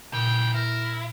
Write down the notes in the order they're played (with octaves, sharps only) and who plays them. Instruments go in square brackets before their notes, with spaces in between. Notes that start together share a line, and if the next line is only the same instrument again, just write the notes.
[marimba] A#2 [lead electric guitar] C#3 E3 [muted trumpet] G5
[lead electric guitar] E4 [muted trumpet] A#4